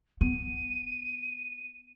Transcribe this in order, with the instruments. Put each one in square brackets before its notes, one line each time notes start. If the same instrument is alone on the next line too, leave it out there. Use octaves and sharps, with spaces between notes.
[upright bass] B3 [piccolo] D#7